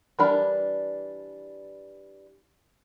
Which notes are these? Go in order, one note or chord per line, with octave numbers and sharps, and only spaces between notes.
E3 G3 D4 A#4 B5